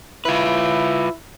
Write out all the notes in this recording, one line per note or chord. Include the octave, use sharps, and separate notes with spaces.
E4 F4 B4